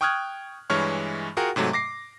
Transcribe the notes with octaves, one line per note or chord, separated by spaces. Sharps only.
G5 C#6 D#6 F6 F#6 G#6
G2 E3 G#3 C#5 C#6 F6
F4 F#4 G#4 A#4 F#5 G5
G#2 C3 F#3 A3
D6 A#6 C7